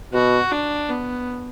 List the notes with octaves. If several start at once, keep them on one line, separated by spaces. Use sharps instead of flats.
B2 F#4
D4
B3